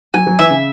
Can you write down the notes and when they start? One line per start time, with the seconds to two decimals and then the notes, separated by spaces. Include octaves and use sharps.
0.14 F#3 G#5
0.27 F#3
0.39 E3 E5
0.50 C#3